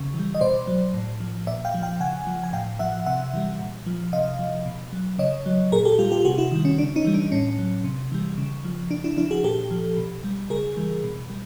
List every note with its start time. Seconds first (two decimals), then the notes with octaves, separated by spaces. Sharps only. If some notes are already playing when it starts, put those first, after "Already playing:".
Already playing: C#3
0.14 E3
0.19 G3
0.35 D#5
0.41 B2 C5 D5
0.67 F#3
0.94 A2
1.20 F3
1.47 A#2 D5 E5
1.65 F5 G5
1.74 F3
1.82 F5 G5
2.00 C#3 F#5 G#5
2.27 F3
2.43 G#5
2.53 A2 F5 G5
2.79 F3 E5 F#5
3.06 C3 E5 F#5
3.33 E3 G3
3.59 A#2
3.86 F3
4.12 C3 D#5 F5
4.39 F3
4.66 B2
4.92 F#3
5.18 C#3 C#5 D#5
5.46 F#3
5.72 A#2 G#4 A#4
5.85 G4 A4
5.99 G3 F4 G4
6.12 F4 G4
6.25 C3 F#4 G#4
6.38 E4 F#4
6.51 D#3 G3
6.65 C#4
6.78 C#3 D4
6.96 C#4 D#4
7.05 E3 G3
7.14 D4
7.32 A2 C#4
7.58 F#3
7.84 C3
8.12 E3 G3
8.38 C#3
8.64 F3
8.90 C#3 D4
9.04 D4 E4
9.17 F3 D4 E4
9.31 F#4 G#4
9.44 A#2 G4 A4
9.71 F3
9.97 B2
10.24 G3
10.50 C#3 G#4 A#4
10.77 E3 G3
11.04 B2
11.30 G3